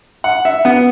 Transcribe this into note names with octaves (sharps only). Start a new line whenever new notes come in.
F#5
E5
B3